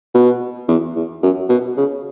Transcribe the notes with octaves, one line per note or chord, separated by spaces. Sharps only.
B2
E2
E2
F#2
B2
C#3